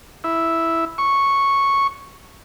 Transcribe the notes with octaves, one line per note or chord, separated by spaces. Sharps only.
E4
C#6